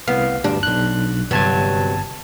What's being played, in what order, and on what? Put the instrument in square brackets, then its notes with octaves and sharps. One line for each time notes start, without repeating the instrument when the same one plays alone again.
[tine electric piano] C2 F5 [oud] B3
[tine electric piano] D2 G2 G3 [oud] D4
[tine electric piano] B1 F#6
[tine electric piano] G1 A5 G#6 [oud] G2 C3 F#3